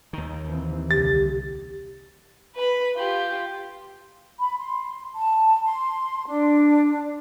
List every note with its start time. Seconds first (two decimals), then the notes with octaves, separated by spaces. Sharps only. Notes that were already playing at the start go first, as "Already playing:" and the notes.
0.13 D#2 D#3
0.48 E3 C4
0.91 C2 D3 G4 A6
2.56 B4 B5
2.97 F4 G4
4.39 B5
4.58 C6
5.15 A5
5.64 C6
6.27 D4